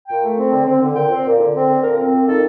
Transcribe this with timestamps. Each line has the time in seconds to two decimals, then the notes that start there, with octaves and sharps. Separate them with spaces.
0.09 A#2 G5
0.23 A3
0.37 C4
0.52 D3
0.66 C4
0.81 D3
0.95 A#2 G5
1.10 C4
1.26 A#2
1.39 D3
1.54 C4
1.69 D3
1.83 A#2 A#4
1.98 C4
2.12 A#2
2.27 D#3 A4